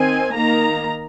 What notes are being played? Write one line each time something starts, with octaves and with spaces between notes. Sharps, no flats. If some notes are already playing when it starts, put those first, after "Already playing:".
Already playing: D#3 C4 G#5
D#3 A#3 A#5